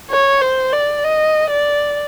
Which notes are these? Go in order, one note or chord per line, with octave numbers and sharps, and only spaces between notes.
C#5
C5
D5
D#5
D5